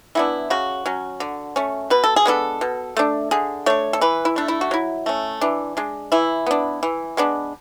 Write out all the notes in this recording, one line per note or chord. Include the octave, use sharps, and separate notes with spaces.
E3 B3 D4 E4
C#3 F#4
F#3 C#4
D3
A3 C#4
B2 B4
A4
G#4
G#3 B3 D4 A4
B2
A3 D4
D3 G#4
A3 D4 C#5
A4
E3 B4
E4
A3 D4
E4
F#4
F#3 E4
A3 C#4
E3 D4
G#3 D4
E3 E4
B3 D4
E3
G#3 B3 D4